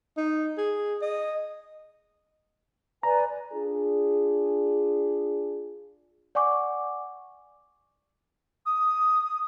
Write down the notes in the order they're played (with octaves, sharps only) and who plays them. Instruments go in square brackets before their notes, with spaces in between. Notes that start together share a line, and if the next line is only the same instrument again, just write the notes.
[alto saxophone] D#4
G#4
D#5
[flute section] B4 D5 G#5 [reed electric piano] A#5
[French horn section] D4 F4 G#4
[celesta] D5 F#5 G#5 C#6 D6
[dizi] D#6